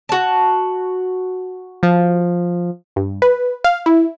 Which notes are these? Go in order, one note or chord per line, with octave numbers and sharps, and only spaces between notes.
F#4 A5
F3
G2
B4
F5
E4